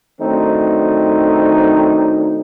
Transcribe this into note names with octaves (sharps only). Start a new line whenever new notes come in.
D#3 F#3 A3 C4 D4 D#4